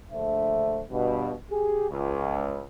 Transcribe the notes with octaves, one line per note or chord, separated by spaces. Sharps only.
A#1 D3 A3 C5 E5
G2 B2
G4 G#4
C#2